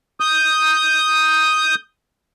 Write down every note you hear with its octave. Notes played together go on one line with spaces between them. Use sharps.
D#6 G6